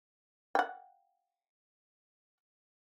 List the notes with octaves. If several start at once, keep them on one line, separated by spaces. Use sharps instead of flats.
F#5 G5